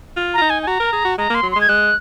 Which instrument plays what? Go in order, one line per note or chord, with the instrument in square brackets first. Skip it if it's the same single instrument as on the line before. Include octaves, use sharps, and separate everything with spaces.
[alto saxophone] F4
[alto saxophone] F4 [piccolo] A#5
[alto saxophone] D#4
[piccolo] G#5
G#5
[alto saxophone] F#4 [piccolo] A#5
[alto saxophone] A#4
G#4
F#4
[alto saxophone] G#3 [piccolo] A#5
[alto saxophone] A#3 [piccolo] C6
[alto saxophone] F#3
[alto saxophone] G#3 [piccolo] C6
[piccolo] G#6
[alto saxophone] G#3 [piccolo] F#6